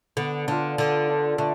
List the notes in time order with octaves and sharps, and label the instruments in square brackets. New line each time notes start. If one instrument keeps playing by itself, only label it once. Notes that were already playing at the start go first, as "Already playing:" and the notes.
[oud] D3 [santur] B3
[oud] D3 [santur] D4 F4
[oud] D3 [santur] B3
[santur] D4 F4
[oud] D3 [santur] A3